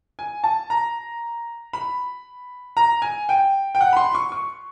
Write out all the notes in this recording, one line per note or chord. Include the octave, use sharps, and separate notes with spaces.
G#5
A5
A#5
B5
A#5
G#5
G5
G5
F#5
B5
C6
C#6
C#6